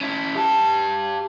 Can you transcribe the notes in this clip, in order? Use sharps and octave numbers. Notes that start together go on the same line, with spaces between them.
C#4 E4
G4 A5